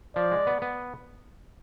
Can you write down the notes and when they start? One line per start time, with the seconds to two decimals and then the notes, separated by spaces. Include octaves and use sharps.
0.15 F3 D5
0.32 G#3
0.47 B3
0.62 B3